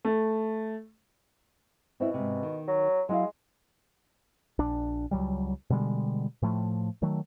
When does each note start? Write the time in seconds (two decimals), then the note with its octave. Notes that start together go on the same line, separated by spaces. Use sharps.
0.05 A3
2.00 B2 C4 E4
2.14 G#2 C3
2.43 D#3
2.67 F#3
3.09 F#3 G#3 E4 F5
4.59 A#1 D4
5.11 C#2 F#2 F#3 G3
5.70 B2 D3 G3 G#3
6.42 A2 F3 A3
7.02 D#3 F#3 A3